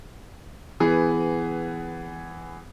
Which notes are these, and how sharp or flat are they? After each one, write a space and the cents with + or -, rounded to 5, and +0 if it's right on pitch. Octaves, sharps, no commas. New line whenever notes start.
E3 +5 B3 +20 G#4 +0